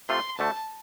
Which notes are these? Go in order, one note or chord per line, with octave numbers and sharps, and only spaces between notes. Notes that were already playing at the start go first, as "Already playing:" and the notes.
C3 A3 F4 C6
D2 D3 A3 A5